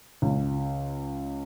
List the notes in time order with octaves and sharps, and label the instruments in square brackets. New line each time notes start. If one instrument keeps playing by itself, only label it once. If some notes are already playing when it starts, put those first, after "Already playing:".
[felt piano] C#2